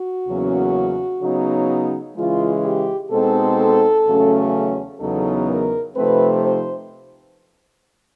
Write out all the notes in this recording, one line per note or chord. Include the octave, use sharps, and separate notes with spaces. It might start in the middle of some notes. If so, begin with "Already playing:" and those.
Already playing: F#4
E2 C#3 F#3 A#3 C#4
C#3 F#3 B3 D#4
C#3 E3 G#3 F4
G4
B2 G#3 C4 D#4 A4
E2 C#3 F#3 A3 C#4
E2 C#3 F#3 B3 D#4 A4
A#4
C3 F3 A3 C4 D#4 B4
C5